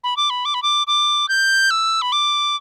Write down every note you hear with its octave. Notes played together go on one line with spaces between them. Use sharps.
B5
D6
B5
D6
B5
D6
D6
G6
E6
B5
D6